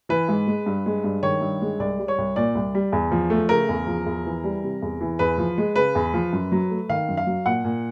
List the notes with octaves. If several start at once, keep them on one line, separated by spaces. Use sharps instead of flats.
E3 B4
G#2
G#3
G2
G#3
G2
D#3 C#5
G2
G#3
C2 D5
G3
C#5
C2
A#2 D5
C2
G3
E2
F3
A3
C#3 A#4
E2
F3
E2
E3
G3
C3
E2
E3
E2 B4
F3
G#3
C#3 B4
E2
F3
F#2
F#3
A3
D#3 F5
F#2
F5
F#3
A#2 F#5
A#2